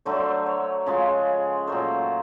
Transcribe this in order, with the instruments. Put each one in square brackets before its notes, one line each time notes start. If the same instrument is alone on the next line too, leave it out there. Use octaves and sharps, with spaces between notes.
[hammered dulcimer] D3 F#3 A3 C5
C#5
C#3 F3 G#3
A#2 F#3 A3 C5